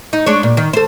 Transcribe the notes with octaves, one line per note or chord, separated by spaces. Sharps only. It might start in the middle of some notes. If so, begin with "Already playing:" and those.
D#4
G#3 D4 C#5
A#2
D#3
A4 C5